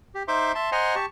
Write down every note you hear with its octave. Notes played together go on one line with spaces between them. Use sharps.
G4
D#4 C5 E5 C6 D6
E5 A5 C6
C5 D#5 F#5 G#5 A#5 C6
G4 A5 C#6